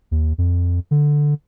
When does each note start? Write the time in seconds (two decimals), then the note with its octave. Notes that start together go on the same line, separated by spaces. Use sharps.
0.11 D#2
0.38 F2
0.91 D3